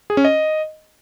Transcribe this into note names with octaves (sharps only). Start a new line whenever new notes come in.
G#4
C#4
D#5